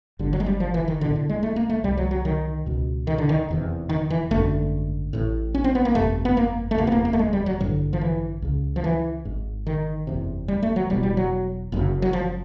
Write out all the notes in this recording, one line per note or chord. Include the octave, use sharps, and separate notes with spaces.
G1 G2 D3
F#3
G#3
G3
F3
E3
D#3
B1 A2 D3
D3
G#3
A3
A#3
A3
C2 C3 G3
F#3
F#3
D#3
C#2 B2
D#3
D3
D#3
F1 E2 C3
D#3
E3
G#1 F#2 D3 A3
A1 A2
C#4
C4
B3
A#3
G1 F2 C3 A3
B3
A#3
A3
F#1 E2 C3 A#3
B3
A#3
A#3
A3
G#3
G3
F#3
A1 G2 D3 F3
F3
E3
C#2 C#3
F3
E3
G#1 G#2
D#3
F#1 E2 C3
G3
A3
F#3
E1 E2 B2 G3
G3
F#3
F#1 F#2 C#3
F#3
F3